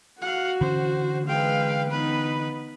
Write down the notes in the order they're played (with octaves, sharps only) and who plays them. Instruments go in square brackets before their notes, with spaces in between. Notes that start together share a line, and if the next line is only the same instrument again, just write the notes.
[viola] F#4 [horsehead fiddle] F5 F#5
[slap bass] D3 E3 C#4 [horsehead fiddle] C5
[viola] G#3 B4 [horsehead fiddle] F5 G5
[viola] B3 D#4 [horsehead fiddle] B4